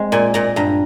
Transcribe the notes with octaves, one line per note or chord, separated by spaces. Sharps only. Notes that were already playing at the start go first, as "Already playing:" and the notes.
Already playing: G#3 C4
A#2 G#5
A#2 A#5
G2 A#5